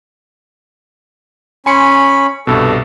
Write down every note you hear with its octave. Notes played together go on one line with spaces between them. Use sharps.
C#4 G#5 B5 C6 C#7
C2 G2 B2 A4